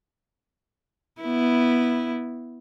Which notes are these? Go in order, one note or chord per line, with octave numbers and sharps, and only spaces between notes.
B3 E4